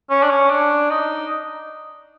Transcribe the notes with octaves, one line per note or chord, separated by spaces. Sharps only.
C#4
D4
C#4
D4
D#4